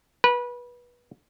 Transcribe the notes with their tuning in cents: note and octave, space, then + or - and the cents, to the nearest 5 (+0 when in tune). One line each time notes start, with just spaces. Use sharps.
B4 -25